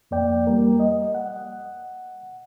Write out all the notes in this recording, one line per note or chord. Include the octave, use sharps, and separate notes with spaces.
F2 A#3 D5 G5
G3 A#3 A#4
D#5
F#5